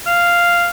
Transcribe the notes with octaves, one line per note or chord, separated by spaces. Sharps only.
F5